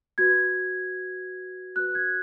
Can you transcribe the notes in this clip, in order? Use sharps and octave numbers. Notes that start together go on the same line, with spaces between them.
F#4 B4 G#6
F#4 B4 F#6
G#6